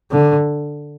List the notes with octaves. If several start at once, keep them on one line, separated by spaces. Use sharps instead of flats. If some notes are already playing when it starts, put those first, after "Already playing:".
D3